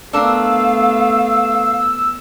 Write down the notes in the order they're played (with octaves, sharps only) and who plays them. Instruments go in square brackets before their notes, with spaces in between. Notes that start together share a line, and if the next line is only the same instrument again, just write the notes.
[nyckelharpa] A3 B3 [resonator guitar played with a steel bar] D4 A#4 [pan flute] F5 [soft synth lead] E6